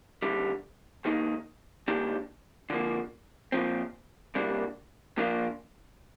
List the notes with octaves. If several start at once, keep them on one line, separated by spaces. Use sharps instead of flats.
D#2 D3 G3
G2 D#3 A#3 D#4
G2 D#3 A#3 D4 G4
D3 F3 A#3
A#2 F3 C4
C2 A#2 G3 A#3 D4
A#2 F3 A#3 D4 F4